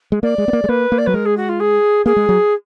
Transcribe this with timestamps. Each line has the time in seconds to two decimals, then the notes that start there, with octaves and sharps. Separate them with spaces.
0.12 G#3
0.23 A#3 D5
0.38 G#3
0.48 B3
0.53 A#3
0.64 G#3
0.69 A#3 B4
0.92 A#3
0.98 D5
1.06 F#3 B4
1.14 G#3 A#4
1.25 G#4
1.37 F#4
1.49 F4
1.60 G#4
2.05 A#3 G#4
2.16 G#3
2.29 F#3